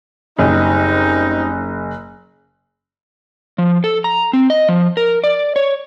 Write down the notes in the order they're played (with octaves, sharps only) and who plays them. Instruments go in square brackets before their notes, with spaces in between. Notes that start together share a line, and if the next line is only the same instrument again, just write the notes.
[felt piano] F#1 [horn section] G3 C4 D#4
[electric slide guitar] F3
A4
A#5
C4
D#5
F3
A#4
D5
C#5